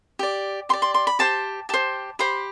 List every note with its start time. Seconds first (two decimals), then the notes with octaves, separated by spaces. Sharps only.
0.19 G4 D5
0.69 G4 C6
0.73 D5
0.82 C6
0.94 C6
1.07 B5
1.19 G4 C5 A5
1.69 G4 C5 A5
2.19 G4 C5 B5